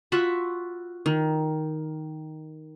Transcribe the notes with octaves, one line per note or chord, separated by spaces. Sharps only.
F4 F#4 E5 B5
D#3